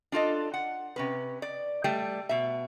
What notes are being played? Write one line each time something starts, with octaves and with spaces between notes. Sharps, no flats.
D4 F4 A4 D#5
F#5
C3 C#4 B4
D5
G3 A3 G5
B2 E5